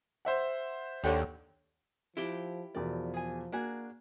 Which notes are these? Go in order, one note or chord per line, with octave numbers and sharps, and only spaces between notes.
C5 E5 F#5
D#2 D3 G4 C#5
F3 E4 G4
E2 B2 F3 A#4 D5
G#4 G#5
A#3 D4 F#4 G#4